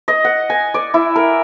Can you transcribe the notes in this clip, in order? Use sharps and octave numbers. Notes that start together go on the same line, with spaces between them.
D#5
F#5
G#5
D5
E4
A#4